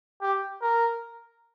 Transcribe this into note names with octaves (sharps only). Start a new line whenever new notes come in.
G4
A#4